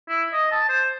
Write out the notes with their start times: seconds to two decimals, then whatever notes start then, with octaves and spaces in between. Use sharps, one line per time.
0.09 E4
0.33 D#5
0.52 A5
0.69 C5